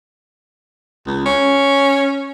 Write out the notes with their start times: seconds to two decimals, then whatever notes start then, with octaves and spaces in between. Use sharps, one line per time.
1.07 C#2
1.26 C#4